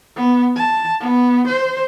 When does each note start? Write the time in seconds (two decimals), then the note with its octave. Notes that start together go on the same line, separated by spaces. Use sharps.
0.16 B3
0.56 A5
1.01 B3
1.47 C5